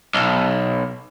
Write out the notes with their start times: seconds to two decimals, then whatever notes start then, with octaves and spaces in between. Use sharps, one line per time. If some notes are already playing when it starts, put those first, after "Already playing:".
0.15 B1